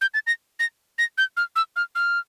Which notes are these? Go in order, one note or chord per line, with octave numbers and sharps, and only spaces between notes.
G6
A6
A#6
A#6
A#6
G6
F6
E6
F6
F6